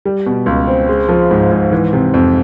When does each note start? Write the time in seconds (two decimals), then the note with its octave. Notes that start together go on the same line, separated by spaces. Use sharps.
0.05 G3
0.26 B2
0.46 C#2
0.67 C4
0.89 G#3
1.09 F3
1.31 G#2
1.51 G#2
1.72 E3
1.93 C3
2.14 F2